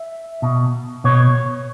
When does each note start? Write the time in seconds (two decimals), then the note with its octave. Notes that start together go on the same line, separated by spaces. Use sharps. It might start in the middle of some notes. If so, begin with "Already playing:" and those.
Already playing: E5
0.42 B2
1.04 B2 C#5